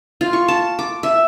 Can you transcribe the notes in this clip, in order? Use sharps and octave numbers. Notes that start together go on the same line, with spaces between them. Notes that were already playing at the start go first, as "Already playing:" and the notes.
F4
C#6
A5
D6
E5